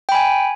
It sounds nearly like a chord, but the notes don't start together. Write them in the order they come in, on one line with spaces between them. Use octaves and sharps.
G5 B5 G#5